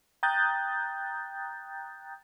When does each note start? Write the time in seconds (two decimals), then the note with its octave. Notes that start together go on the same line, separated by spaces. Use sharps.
0.23 G5 A#5 D#6 F#6 G6 A6